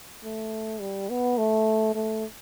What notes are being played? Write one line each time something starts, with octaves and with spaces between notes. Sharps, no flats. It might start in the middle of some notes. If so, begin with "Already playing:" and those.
A3
G3
B3
A3
A3